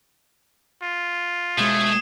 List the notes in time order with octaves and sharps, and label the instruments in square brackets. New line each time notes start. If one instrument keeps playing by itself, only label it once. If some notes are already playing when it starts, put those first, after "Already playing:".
[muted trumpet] F4
[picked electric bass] B2 G#3 [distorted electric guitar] A3 [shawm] G#4